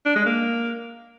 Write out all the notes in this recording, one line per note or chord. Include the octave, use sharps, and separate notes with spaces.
D4
G#3
A#3